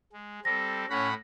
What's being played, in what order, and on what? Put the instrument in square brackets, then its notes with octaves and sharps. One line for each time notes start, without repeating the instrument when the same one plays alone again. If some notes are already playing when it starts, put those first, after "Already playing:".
[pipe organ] G#3
[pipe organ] G3 C4 A4 [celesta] A#6
[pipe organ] A2 F#5 B5 [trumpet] C#4